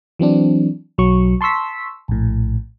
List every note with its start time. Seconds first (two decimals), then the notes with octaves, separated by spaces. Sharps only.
0.19 E3 F#3 C4 D4
0.98 B1 F#3 C#6
1.41 A5 C6 C#6 E6 B6
2.08 A#1 A2